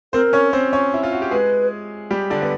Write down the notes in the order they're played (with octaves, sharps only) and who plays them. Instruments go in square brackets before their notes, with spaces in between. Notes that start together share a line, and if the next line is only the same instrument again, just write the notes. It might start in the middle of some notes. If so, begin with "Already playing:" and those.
[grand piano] C4 C5 [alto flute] A#4
[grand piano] C#4 C#5
C4 C5
C#4 C#5
E4
F4
F#4
G4
[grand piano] G#3 G#4 [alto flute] B4
[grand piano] G3 G4
D3 D4
B3